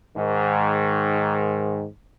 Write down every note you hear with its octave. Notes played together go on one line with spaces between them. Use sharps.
G#2 D#3